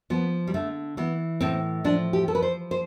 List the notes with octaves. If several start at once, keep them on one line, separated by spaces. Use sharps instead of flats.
F3 B3
G3
D3 A3
E3 B3
A2 C4
F3 D4
G4
F3 A4
B4
C5
C5